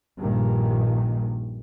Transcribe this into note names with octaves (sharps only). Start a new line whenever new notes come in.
A#1 G2 A#2 D#3